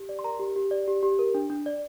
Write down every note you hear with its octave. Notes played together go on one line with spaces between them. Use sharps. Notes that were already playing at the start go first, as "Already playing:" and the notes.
Already playing: G4
D5
C6
A#4 A#5
G4
G4
D5
G4
G4
A#4
D4
D4
D5